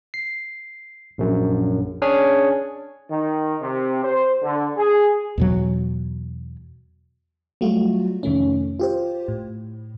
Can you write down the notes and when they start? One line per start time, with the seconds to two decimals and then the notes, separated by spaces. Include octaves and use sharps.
0.14 C7
1.18 A#1 F#2
2.02 C#4 D4 G#4 C#5 G#5
3.09 D#3
3.60 C3
4.03 C5
4.43 D3
4.77 G#4
5.38 E2 B2 F#3
7.61 F#3 G3 A3 F4 F#4
8.23 F2 C3 D#3 A3 C#4
8.80 F4 G4 C5
9.28 A2